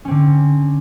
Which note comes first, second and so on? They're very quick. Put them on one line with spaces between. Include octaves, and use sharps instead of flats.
C#4 C4 D3